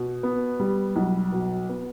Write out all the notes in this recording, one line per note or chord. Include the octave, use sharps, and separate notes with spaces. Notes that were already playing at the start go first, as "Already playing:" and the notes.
Already playing: B2
B3
G3
B1
B2
B3